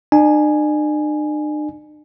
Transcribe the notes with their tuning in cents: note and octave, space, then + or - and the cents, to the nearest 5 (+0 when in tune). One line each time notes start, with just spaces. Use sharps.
D4 +45 G#5 +5